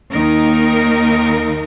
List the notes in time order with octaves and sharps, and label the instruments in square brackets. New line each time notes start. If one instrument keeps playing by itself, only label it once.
[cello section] D#2 D#3 A#3 D#4 A#4